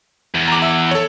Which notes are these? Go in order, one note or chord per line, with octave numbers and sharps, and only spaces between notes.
E2
A#5 D6
E5 E6
A4 C#5